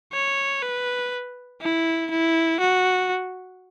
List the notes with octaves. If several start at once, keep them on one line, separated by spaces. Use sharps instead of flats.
C#5
B4
E4
E4
F#4